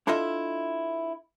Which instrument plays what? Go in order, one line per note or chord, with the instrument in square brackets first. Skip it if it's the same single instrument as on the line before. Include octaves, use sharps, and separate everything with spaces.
[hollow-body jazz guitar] D4 E4 F4 A4 D#5 E5